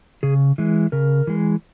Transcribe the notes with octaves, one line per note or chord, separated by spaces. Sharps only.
C#3 G#4
E3 G#3
C#3 A#4
E3 G#3